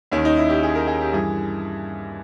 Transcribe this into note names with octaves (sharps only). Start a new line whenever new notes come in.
D#2 D#3 C#4
D#4
E4
G4
G#4
A#4
G#4
G4
G2 E3 G#4